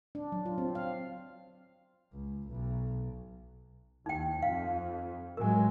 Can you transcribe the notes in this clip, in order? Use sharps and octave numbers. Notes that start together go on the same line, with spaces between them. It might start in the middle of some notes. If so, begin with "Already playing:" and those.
D4
F#3
F4
C4
F5
C#2
B1
D#2 D#4 G5
F2 F5
A2 F#3 G#3 A#4 G#5